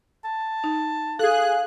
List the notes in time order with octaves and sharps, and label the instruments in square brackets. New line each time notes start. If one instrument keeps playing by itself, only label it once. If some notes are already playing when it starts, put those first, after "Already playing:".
[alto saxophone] A5
[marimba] D#4
[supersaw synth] G#4 F#6 [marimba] A4 [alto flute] F5